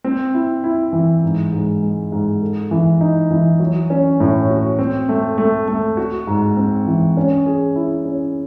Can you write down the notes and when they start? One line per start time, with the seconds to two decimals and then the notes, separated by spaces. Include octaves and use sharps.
0.04 C4
0.34 E4
0.64 E4
0.93 E3
1.23 G#2
1.53 G#2
1.83 G#3
2.12 G#2
2.42 A4
2.71 E3
3.01 D#4
3.31 E3
3.60 F#3
3.90 C#4
4.20 A2
4.50 F#4
4.79 C4
5.09 A3
5.38 A3
5.68 A3
5.97 F#4
6.27 G#2
6.57 C4
6.87 E3
7.17 C#4
7.46 G#4
7.75 E4
8.05 C#4